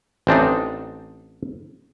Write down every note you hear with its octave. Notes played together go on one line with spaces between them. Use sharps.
A1 C4 D4 D#4